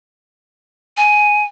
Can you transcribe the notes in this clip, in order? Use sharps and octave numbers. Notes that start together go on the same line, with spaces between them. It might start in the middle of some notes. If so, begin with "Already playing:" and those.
G#5